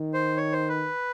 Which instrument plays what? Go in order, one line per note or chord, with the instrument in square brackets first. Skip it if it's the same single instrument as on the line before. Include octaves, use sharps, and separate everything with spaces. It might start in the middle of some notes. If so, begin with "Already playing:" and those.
Already playing: [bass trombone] D#3
[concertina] C5
C#5
C5
B4